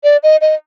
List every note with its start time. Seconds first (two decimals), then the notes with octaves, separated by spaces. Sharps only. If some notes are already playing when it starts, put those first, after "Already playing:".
0.04 D5
0.23 D#5
0.41 D#5